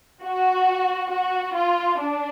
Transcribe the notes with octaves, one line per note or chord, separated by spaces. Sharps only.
F#4
F#4
F4
D4